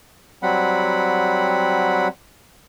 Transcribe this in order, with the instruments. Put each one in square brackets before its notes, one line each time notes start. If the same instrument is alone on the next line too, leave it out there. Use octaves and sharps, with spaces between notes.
[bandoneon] F#3 G3 C4 F#5 B5